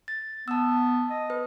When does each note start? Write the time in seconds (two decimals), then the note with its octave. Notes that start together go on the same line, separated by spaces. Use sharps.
0.08 A6
0.48 B3 A5 E6
1.10 D#5
1.30 B4